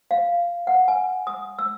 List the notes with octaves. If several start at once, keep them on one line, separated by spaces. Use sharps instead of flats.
F5
F#5
G#5
D#6
E6